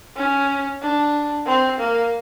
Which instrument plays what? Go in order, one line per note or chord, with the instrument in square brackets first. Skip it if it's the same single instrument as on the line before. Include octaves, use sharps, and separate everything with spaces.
[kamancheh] C#4
D4
C4
A#3